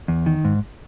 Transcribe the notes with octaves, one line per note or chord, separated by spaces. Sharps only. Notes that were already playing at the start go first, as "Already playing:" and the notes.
E2
D#3
G#2